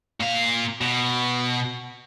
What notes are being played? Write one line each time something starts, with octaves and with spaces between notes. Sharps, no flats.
A#2 F5
B2